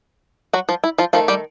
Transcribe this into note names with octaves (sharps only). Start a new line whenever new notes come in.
F#3 F#4
F3 F4
E4
F3 F4
D#3 F3 A3 F4
G3 G4